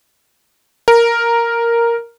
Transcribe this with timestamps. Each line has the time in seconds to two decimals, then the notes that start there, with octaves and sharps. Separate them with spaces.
0.88 A#4